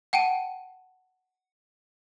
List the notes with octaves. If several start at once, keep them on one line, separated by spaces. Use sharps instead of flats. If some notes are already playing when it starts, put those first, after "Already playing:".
F#5 G5 A5 D7 D#7